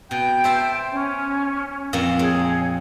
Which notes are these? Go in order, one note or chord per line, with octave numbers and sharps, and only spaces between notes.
B2 G5 G6
C5 E5 A5
C#4
F2 A#2 A#3
A#2 G#4 C#5